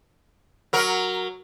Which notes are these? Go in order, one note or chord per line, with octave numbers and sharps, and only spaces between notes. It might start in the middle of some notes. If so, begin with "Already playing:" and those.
F#3 A#4